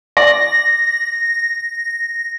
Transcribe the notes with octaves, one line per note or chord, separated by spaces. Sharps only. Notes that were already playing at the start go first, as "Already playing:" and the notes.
D5 A#6